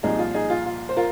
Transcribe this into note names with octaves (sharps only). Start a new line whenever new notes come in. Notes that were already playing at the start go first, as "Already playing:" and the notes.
C2 A#2 F3 D#4 G#4
F4
D#4 G#4
F4
F4
C5
F4 A#4